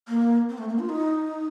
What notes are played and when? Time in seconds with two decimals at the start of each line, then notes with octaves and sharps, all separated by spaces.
0.08 A#3
0.49 C4
0.58 A3
0.69 A#3
0.79 F4
0.89 D#4